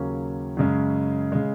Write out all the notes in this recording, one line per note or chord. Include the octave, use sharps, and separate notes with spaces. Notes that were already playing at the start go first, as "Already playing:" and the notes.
Already playing: D#2 C#3 F#3 A#3 C#4
F#2 C#3 G#3 C#4
C#3 G#3